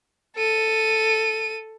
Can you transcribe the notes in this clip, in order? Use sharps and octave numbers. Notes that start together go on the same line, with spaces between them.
A4 D#7